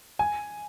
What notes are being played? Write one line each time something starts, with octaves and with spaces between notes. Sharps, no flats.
G#5